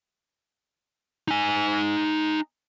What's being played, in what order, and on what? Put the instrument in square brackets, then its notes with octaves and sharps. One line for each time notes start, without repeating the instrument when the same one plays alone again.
[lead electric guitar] D#4 G#5